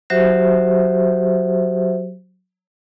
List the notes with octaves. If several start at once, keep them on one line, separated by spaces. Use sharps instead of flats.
F#3 F#4 G4 C5 E5